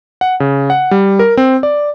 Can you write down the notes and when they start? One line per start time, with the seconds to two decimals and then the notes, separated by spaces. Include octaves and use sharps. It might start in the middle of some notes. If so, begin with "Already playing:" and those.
0.21 F#5
0.40 C#3
0.70 F#5
0.91 G3
1.19 A#4
1.37 C4
1.63 D5